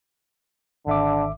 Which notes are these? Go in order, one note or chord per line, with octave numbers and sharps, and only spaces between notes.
G#1 D3 E5 D6